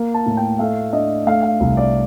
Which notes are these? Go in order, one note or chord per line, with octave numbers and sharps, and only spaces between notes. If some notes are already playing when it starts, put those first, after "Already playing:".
Already playing: A#3
A5
A2
G5
A3 F5
D4 D#5
A3 F5
F5
C2
D5